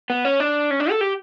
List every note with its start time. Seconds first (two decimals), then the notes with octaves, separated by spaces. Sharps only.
0.10 B3
0.25 C#4
0.40 D4
0.70 C#4
0.80 D4
0.90 A4
1.01 G4